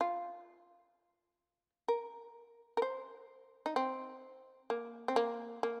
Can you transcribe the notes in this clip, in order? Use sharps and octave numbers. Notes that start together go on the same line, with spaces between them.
F4
A#4
A#4
C5
D#4
C4
A#3
C4
A#3
A#3